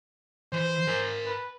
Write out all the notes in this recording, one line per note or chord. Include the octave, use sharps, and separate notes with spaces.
E3 C5
A#4 G#5
B4